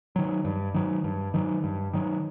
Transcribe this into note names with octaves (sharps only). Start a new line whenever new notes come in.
D#3 F#3
G2
D#3 F#3
G2
D#3 F#3
G2
D#3 F#3